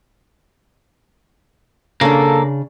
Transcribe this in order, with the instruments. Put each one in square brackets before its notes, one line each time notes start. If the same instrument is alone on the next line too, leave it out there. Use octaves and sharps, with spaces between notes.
[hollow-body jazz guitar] C#3 D4 [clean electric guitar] A#3 [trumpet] A4